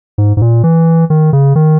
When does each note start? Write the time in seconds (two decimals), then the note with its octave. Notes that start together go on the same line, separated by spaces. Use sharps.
0.18 G#2
0.37 G#2
0.42 A#2
0.64 E3
1.10 D#3
1.33 C#3
1.55 D#3